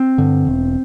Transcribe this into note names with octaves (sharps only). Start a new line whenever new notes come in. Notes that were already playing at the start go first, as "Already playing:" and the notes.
Already playing: C4
G2 D3
E1